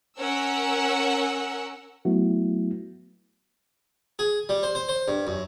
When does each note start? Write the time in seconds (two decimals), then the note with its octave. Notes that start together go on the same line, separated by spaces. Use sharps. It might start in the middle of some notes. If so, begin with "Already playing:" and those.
0.18 C#4 A#4 F#5 E6
2.05 F#3 A3 B3 E4 F#4
4.19 G#4
4.49 G3
4.63 C5
4.75 C5
4.89 C5
5.08 G2
5.27 F#2